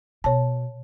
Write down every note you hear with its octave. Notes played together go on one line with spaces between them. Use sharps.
B2 C#5 A5